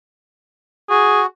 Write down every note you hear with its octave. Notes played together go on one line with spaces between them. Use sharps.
F#4 G#4